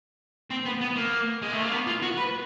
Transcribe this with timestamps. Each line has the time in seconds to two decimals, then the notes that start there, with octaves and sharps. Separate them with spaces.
0.50 C4
0.65 B3
0.81 B3
0.96 A#3
1.42 G#3
1.52 A3
1.62 A#3
1.72 B3
1.87 F4
2.02 F#4
2.17 B4